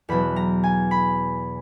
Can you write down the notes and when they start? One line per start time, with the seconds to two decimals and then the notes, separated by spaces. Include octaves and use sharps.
0.09 E2 B2 F#3 B5
0.36 A#5
0.64 G#5
0.91 B5